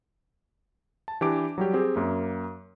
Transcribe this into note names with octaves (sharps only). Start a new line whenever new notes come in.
A5
E3 D4 G4 B4 D6 D7
F#3 G3 G4
C4 G4 G#4
F#2 A#3